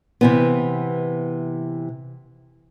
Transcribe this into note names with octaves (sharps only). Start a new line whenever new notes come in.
C3 E3 B3